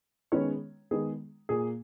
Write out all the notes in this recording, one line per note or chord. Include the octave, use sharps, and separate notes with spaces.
D#3 G#3 B3 C#4 C#5
D#3 G#3 B3 G#4
A#2 A#3 G#4